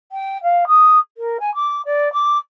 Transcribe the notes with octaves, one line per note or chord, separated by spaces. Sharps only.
G5
F5
D#6
A#4
G#5
D6
D5
D6